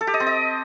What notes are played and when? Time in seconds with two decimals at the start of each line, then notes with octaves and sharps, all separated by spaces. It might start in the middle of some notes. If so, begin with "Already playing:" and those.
0.01 A4
0.07 G4
0.14 D#5
0.20 C4
0.27 D#5